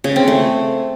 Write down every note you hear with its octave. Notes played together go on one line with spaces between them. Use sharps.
C#3
C4
A3